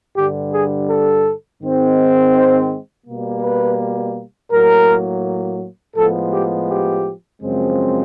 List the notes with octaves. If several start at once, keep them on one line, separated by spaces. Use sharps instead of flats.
G2 D3 G3 G4
G#4
A4
G#2 D#3 G#3 C4
C5
B2 G3 A#3
B4
A2 F#3 A#3 A#4
A2 F3 G#3 B3 A4
G4
G4
F#2 C#3 F3 G#3 C4